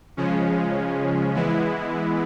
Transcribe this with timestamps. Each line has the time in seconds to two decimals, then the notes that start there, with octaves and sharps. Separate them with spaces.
0.17 C#3 F3 G#3 C#4
1.33 E3 G#3 B3 E4